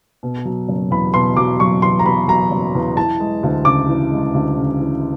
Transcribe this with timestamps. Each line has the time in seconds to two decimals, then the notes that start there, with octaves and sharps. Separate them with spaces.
0.23 B2
0.45 F#3
0.69 F#1
0.91 E2 B5
1.14 B2 C6
1.37 F#3 D6
1.60 F#1 C#6
1.82 E2 C6
1.99 A#5
2.05 B2 B5
2.28 F#3 A#5
2.51 F#1
2.75 E2
2.97 E3 A5
3.20 G#3
3.43 D2
3.65 C#3 D6
3.89 E3
4.12 G#3
4.34 D2
4.57 C#3
4.80 E3